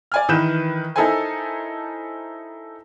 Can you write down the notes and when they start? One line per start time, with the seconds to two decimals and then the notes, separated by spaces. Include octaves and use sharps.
0.12 D5 G#5 F6
0.29 D#3 E3 B4 G6 E7
0.96 D#4 E4 A4 A#4 C5 G#5